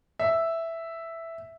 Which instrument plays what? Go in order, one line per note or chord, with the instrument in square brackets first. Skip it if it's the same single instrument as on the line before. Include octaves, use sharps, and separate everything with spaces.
[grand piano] E5